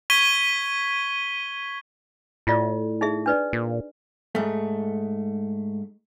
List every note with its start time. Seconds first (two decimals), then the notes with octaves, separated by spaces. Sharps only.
0.10 C#6 G#6 B6 D#7 G7
2.47 A2 E4 F4 D5
3.01 D#4 G#4 E5
3.26 D4 B4 D5
3.53 A#2
4.35 G#2 A3